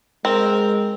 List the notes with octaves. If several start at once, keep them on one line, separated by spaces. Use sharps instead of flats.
G#3 C4 A#4